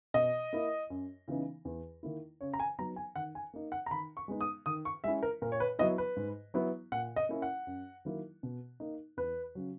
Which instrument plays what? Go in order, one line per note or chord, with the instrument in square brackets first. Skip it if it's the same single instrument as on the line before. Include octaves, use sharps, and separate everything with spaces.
[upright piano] B2 D#5
A#3 E4
F#2
C#3 E3 B3 D#4
E2
D#3 A#3 E4
C#3 C#5
A#5
G#5
F#3 B3 D#4 A#5
G#5
D#3 F#5
G#5
A#3 D#4
F#5
A#5
D#3 B5
C#6
G#3 B3 D#4
D#6
D#3 D#6
C#6
G#3 C#4 E4 E5
A#4
A#2 A#4
C#5
B4
F#3 B3 E4 D#5
B4
G#2
F#3 B3 E4
A#2 F#5
D#5
A#3 C#4 E4
F#5
F#2
D#3 F#3 A#3 E4
B2
A#3 D#4
E2 B4
C#3 F#3